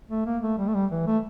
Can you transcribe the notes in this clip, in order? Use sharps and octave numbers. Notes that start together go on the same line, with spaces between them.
A3
A#3
A3
G3
A3
G3
E3
A3